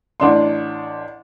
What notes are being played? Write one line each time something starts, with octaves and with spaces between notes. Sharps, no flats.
A1 D4 C6